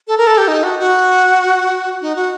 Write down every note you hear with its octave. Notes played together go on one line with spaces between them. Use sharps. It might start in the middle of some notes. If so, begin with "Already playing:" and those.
A4
A#4
A4
G4
D#4
F#4
F#4
D#4
F#4